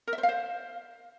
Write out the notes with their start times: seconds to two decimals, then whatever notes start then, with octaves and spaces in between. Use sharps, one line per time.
0.07 A#4
0.13 E5
0.18 C5
0.23 F5
0.29 C5